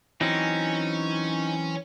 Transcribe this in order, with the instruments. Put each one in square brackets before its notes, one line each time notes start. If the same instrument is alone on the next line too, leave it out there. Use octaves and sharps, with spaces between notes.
[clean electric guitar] E3 F#3 C4 [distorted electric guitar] C#4 [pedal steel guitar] D#4